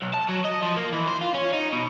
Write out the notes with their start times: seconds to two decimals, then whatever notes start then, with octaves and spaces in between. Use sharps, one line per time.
0.02 B1
0.14 A5
0.29 F#3
0.45 D#5
0.62 F3
0.77 A#3
0.93 E3
1.07 C5
1.21 F4
1.35 C#4
1.53 D#4
1.73 B2